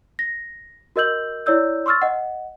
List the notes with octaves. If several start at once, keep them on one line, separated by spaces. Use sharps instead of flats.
A#6
F#4 A#4 D#5 E6 G6 F#7
E4 C#5 D5 E6 G6
C6 C#6 E6 F6 A6
D#5 F#5